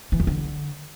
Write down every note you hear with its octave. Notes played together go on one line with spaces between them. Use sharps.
E3
F2
D3